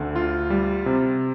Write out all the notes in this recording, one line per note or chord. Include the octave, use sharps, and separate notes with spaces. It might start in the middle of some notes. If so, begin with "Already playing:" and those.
Already playing: D2 D3
F4
G3
C3